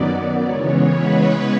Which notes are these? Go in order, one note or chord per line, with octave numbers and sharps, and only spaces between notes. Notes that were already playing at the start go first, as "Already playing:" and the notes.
Already playing: F#2 D#3 F#3 B3 D5
C#3 E3 G#3 B3 C#5
B4